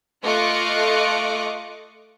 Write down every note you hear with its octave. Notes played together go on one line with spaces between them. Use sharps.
A3 F4 D#5 C#6 D6 F#6